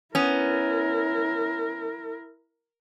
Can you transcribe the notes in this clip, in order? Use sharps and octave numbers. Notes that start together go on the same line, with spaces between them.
B3 C#4 E4 A#4